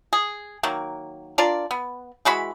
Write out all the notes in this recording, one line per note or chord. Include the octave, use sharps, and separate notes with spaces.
G#4
D#3 F#3 A#3
D4 F4 A#4 D5
B3
E3 G#3 F#4 B5